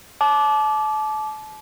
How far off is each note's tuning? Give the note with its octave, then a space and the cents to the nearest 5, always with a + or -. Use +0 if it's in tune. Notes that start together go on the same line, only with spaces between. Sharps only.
A5 -35 D6 +0